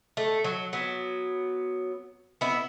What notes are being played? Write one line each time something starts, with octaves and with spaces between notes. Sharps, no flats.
A3
F#3
F#3 B3
B3 E4